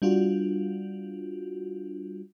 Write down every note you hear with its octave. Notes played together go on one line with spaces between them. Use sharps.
G3 D4 F4 F#4